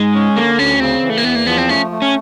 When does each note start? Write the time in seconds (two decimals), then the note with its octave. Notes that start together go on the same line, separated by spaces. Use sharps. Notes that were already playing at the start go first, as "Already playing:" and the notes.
Already playing: G#2 G#3
0.14 C#4
0.36 D3 A#3
0.58 D2 C#4
0.80 C#3 C4
1.02 E3
1.10 A3
1.17 A#3
1.24 E2 B3
1.35 A#3
1.47 F3 B3
1.57 C4
1.69 A3 C#4
1.91 A3
2.02 C#4